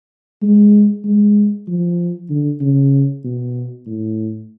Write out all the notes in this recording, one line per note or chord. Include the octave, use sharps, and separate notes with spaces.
G#3
G#3
F3
D3
C#3
B2
A2